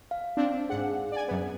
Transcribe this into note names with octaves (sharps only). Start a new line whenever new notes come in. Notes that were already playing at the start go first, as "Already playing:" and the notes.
F5
C4 D4
G#2 G#4 F#5
D5 G#5
F#2 B3